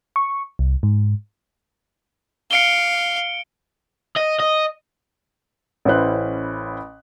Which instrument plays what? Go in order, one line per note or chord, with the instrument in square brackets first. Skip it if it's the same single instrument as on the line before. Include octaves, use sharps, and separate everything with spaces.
[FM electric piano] C#6
C2
G#2
[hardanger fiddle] F5 [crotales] C#7 D7 G7
[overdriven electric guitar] D#5
D#5
[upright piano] A1 C#4 E4 B4 C5 F#6